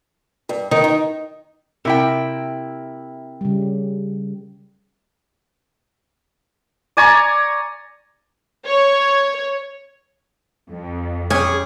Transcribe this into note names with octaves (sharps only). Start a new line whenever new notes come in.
G2
D#3 D#4
D#3
C3 E4 A#4 G5
C#3 G3
D5 G#5 A#5 C#6
C#5
F2
C#4 G4 G#4 B4 C#6